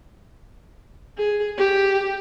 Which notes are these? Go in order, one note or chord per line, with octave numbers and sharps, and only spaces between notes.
G#4
G4